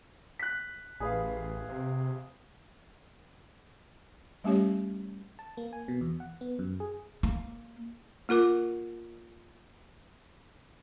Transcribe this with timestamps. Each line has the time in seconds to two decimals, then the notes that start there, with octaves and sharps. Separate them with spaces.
0.39 F#6 B6
1.00 A1 G#4 B4 F5
1.69 C3
4.44 G3 A3 C#4 G4 C#5
5.39 A5
5.57 A#3
5.73 G#5
5.88 B2
6.01 E2
6.20 F#5
6.41 B3
6.59 F#2
6.80 G#4
7.23 A#3
8.29 A#3 F4 A#4 D6